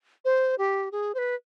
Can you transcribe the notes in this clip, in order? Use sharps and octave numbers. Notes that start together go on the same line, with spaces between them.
C5
G4
G#4
C5
B4